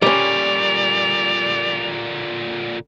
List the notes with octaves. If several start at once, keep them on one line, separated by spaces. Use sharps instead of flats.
A#2 D3 G3 C#4 D5 F7